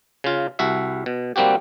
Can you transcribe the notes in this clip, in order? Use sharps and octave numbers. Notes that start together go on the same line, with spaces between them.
C#3 F4
C2 F#4 E5
B2
G3 A#3 C4 F#4 G4